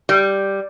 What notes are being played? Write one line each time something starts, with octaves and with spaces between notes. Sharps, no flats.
G3